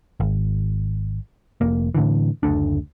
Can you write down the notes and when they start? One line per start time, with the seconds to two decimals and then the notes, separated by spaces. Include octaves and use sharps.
0.20 G#1
1.61 F1 A#3
1.95 A2 D3 E3
2.43 F#1 D2 A3 D4